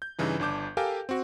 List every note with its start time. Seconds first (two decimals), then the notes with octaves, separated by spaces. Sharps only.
0.02 G6
0.19 G2 C#3 E3 D#4
0.40 G1 D4 A5 D6 G6
0.77 G4 A4 A#4 F5 G5 G#5
1.09 C4 F#4